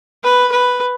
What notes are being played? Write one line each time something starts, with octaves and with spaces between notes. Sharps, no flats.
B4
B4